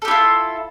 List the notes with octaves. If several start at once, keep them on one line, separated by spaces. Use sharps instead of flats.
E4 F4 G4 A4